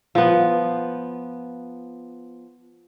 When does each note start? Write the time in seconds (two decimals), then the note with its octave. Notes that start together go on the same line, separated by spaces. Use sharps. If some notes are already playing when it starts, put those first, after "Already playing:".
0.15 F3 B3